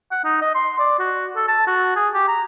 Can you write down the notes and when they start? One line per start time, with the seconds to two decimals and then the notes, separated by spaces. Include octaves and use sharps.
0.11 F#5
0.25 D#4
0.42 D#5
0.55 C6
0.79 D5
0.99 F#4
1.36 A4
1.48 A5
1.67 F#4
1.96 G#4
2.14 G4
2.28 A#5